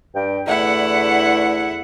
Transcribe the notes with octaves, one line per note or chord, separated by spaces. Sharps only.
G2 G5
E2 D3 A3 E4 F#5